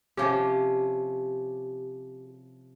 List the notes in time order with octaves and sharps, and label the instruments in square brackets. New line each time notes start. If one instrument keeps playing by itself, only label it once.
[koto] C3 F3 C#4 [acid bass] G4